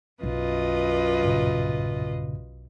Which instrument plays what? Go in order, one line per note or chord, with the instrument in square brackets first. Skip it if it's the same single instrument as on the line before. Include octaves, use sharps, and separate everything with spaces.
[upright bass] B1 [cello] F#2 F4 [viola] B4 D#5
[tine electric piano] G2 A#2 C#3